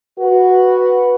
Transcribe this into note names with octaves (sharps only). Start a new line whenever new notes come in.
F#4 B4